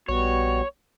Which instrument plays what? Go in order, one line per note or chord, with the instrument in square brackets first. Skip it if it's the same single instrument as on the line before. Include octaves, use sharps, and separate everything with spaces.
[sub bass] A#1 [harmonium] G3 B3 F#4 [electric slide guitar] C#5